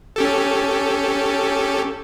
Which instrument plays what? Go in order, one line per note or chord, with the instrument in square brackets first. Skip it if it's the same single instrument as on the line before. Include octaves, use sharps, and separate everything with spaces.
[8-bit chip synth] C#4 G4 A4